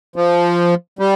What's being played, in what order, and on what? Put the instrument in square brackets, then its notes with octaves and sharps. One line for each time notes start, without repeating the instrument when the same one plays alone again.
[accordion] F3
G3